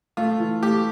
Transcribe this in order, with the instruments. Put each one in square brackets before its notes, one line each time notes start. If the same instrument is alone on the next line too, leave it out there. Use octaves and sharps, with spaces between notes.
[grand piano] A3 [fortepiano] F4
[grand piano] E3
[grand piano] A3 [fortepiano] G4